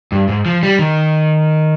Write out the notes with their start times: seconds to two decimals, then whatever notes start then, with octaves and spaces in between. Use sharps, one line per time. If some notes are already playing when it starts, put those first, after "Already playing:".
0.12 G2
0.29 G#2
0.46 F3
0.63 G3
0.79 D#3